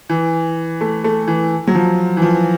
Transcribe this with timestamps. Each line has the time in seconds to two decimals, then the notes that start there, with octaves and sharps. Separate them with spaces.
0.09 E3
0.81 A3
1.04 A3
1.28 E3
1.67 F#3
1.75 F3
2.17 E3
2.22 F3